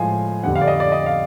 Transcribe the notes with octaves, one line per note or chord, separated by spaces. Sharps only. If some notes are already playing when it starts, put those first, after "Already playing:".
Already playing: A2 F3 G#3 F5 G#5
F2 D3 G3 C4 F#5
F5
D5
D#5
D5
D#5
F5